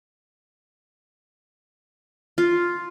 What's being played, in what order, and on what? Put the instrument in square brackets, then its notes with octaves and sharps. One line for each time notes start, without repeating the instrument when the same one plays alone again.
[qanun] F4